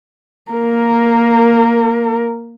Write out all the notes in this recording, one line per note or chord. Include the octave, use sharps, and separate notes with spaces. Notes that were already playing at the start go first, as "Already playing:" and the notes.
A#3 A#4